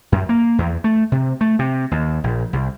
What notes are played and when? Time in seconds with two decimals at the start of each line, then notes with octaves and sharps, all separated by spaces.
0.12 F#2
0.29 A#3
0.58 E2
0.84 A3
1.12 C3
1.41 A3
1.59 C3
1.91 D#2
2.24 A#1
2.53 C2